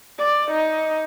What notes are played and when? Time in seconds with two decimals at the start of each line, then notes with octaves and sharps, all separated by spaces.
0.19 D5
0.51 D#4